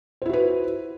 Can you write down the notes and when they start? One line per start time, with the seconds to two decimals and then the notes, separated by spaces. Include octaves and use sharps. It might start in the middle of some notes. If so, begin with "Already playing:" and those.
0.22 C5
0.26 E4
0.29 F#4
0.33 B4